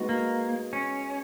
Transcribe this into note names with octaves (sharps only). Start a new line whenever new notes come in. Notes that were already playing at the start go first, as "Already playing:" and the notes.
Already playing: G#3 B3 D#4 F#4
A#3
C#4